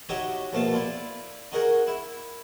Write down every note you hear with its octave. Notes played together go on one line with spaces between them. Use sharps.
D#4 F#4 G4 C#5 D#5 E5
A#1 B2 A3 F5 A5
E4 F4 D5
D#4 F#4 G#4 A#4 F#5 G#5
E4